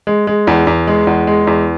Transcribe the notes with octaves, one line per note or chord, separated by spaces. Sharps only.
G#3
G#3
E2
E2
G#3
E2
G#3
E2